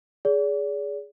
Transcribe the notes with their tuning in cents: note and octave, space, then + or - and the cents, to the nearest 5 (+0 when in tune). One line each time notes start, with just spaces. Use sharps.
G#4 +0 D5 -40